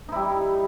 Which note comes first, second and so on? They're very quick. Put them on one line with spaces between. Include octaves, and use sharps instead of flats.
D#4 E4 G3